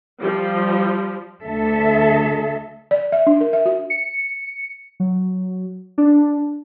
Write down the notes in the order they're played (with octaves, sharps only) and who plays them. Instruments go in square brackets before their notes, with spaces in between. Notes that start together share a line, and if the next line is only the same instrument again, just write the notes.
[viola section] F3 G3
[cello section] D2 D3 A4 E5
[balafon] D5
E5
D4
A#4
E5
F#4
[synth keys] C#7
F#3
D4